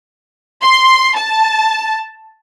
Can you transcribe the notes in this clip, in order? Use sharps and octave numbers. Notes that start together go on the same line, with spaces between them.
C6
A5